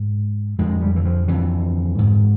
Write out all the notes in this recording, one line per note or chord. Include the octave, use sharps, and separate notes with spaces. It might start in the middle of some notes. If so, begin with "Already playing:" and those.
Already playing: G#2
F2 D3 G#3
G3
E3
F3
F2 D3 E3
G#2